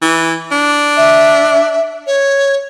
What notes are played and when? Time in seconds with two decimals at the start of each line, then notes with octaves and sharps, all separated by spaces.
0.02 E3
0.51 D4
0.96 E5
2.06 C#5